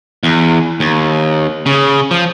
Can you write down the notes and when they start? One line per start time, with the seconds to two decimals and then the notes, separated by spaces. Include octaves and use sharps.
0.23 E2
0.80 D#2
1.66 C#3
2.11 F3